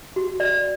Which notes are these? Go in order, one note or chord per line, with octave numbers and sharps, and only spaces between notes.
F#4
D5